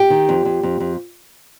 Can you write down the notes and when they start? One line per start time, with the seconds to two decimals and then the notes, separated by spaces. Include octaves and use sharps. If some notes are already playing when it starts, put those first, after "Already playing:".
Already playing: G4
0.10 D#3
0.29 F2
0.45 F2
0.63 F2
0.80 F2